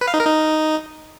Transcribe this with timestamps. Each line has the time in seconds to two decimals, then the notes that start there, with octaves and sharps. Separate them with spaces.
0.01 B4
0.08 F5
0.14 D#4
0.20 A#4
0.26 D#4